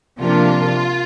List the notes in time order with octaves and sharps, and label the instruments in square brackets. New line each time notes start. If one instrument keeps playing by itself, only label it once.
[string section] C3 F3 A#3 D4 F4